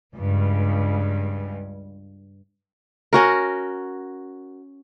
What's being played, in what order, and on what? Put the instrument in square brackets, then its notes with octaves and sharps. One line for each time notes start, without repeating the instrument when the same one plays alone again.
[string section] C#2 G2
[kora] C#4 F#4 A#4